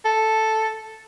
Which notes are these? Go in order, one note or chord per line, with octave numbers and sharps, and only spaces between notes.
A4